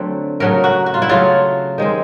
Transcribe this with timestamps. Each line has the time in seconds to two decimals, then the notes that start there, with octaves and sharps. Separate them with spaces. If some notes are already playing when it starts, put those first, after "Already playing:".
Already playing: D3 F#3 A3 C4
0.40 C#3 F#3 A3 A#4
0.64 F#4
0.86 F#4
0.94 F4
1.02 E4
1.09 C#3 F#3 A3 F4
1.78 D#3 G#3 C4